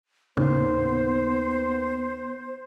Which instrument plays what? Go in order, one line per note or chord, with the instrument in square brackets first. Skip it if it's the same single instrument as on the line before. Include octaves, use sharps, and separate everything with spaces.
[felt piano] D#2 [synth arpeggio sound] A2 C#3 [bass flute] B3 [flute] C5